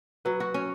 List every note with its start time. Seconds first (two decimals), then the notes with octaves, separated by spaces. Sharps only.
0.25 F#3 B4
0.40 F#4
0.54 C#4